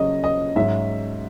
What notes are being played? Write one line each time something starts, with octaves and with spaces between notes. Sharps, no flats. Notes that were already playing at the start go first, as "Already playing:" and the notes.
Already playing: C#3 F#3 C#4 D#5
D#5
G#2 F#3 C#4 E5